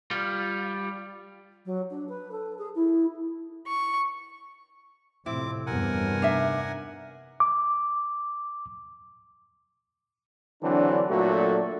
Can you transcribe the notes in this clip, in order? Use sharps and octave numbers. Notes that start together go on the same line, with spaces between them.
G3 F4
F#3
D4
B4
A4
G#4
E4
C#6
F2 A2 C3 C4 E4 D6
E2 G2 C3 A#4 F#5 G#5
D4 D#4 E5
D6
D3 E3 F#3 C4 D4
A#2 F#3 A3 D4 F#4 A4